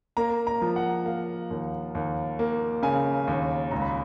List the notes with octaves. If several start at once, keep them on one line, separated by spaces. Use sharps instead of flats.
A#3 A#5
A#5
F3
F#5
A#3 F5
D#2
D#2
A#3
C#3 G#5
D#2
C#2 A#5
B5